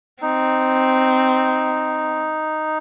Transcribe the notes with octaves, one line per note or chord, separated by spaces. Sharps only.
C4 D#4